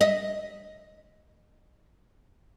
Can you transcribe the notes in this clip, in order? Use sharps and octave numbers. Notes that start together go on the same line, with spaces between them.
D#5 E5